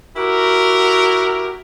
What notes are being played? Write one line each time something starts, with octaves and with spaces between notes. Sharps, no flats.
E4 F#4 G4 A#4